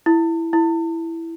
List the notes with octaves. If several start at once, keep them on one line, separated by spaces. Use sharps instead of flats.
E4
E4